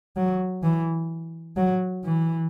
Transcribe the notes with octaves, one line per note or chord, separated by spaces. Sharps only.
F#3
E3
F#3
E3